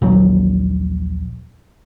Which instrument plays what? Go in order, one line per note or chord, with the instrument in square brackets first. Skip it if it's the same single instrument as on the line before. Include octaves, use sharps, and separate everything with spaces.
[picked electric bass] D#1 A#1 F#3